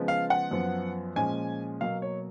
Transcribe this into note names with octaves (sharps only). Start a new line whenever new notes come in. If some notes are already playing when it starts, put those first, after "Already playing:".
Already playing: C#3 F3 G#3 B3
F5
F#5
F#2 F3 B3
A#2 F3 G#3 C#4 G#5
B2 F#3 A#3 F5
C#5